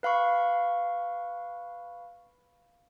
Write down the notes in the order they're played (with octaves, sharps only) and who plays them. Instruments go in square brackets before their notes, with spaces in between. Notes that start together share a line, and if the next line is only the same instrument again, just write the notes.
[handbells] B4 F5 B5 C#6